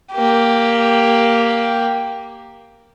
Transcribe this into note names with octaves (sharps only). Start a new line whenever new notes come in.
A#3 G4